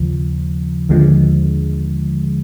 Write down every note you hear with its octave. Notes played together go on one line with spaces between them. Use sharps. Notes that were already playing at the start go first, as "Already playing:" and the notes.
Already playing: D#2 C#3 F3
D#2 D3 F3 G#3